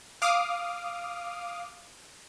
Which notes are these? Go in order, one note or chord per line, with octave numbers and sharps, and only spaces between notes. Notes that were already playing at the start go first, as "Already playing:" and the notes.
F5 D6 D#6 F6